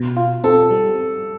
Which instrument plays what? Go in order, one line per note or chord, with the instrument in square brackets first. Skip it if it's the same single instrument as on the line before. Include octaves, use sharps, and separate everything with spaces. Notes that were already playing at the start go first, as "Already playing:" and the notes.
Already playing: [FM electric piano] B2
F4
[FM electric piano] C4 [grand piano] A4
[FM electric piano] G3